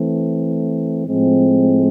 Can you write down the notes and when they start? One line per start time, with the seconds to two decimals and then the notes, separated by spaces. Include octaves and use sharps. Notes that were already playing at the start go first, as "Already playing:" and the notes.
Already playing: E3 A3 C4
1.06 A2 F3 G#3 C4